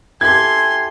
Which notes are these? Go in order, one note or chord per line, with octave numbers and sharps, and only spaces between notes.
E4 G4 A4 G#5 C6 G#6